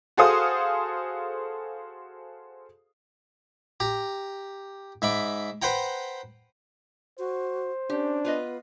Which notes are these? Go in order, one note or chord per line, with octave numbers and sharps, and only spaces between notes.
F#4 G#4 A4 C5 F5 D#6
G4 A#5
G#2 E5 B5 D6
B4 C5 F#5 G5 A#5
F#4 C5
C#4 D4 G4
B3 F4 B4 D#5